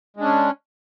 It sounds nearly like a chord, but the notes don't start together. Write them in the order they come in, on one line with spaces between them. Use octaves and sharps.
G#3 D4 C#4